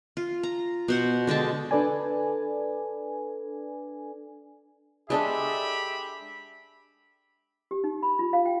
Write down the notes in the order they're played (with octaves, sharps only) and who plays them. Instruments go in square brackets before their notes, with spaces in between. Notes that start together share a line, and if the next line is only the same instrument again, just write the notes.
[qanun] F4
A#5
B2 C5 F#5
D3 G#3 G5 A5
[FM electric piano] D4 A4 B4 D5 G#5
[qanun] G#3 D4 A4 [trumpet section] G4 E5 B5
[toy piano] G4
D#4
B5
F4
F5
G5